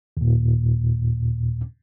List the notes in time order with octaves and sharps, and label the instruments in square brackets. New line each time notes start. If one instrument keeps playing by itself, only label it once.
[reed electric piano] D#2 A#2